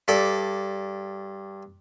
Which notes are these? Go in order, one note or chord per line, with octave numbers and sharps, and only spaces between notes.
G2 A4 D5